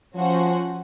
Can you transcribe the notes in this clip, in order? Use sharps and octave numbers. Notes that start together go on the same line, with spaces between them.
F3 C#4 F#4 C5 F#5